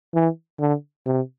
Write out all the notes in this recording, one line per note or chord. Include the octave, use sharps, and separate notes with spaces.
E3
D3
C3